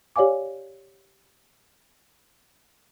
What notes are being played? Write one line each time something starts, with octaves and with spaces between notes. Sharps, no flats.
G4 C#5 D5 F5 G#5 D6